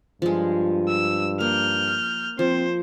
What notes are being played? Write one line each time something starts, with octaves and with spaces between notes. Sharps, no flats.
G2 F3 G#3
E6
A#3 F6 G6
F3 C4 C5